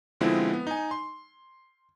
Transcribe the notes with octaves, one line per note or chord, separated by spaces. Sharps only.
B2 D3 F3 G#3 C4 E4
B3
D#4 G#5
C6